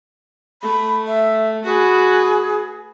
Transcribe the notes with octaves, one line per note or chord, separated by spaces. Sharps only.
A3 B5
E5
F#4 G#4 B4